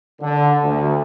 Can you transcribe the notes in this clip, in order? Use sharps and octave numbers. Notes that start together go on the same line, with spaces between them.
D3
D2